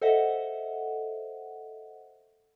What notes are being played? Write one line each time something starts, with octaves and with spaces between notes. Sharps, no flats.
A4 C5 D#5 E5 F#5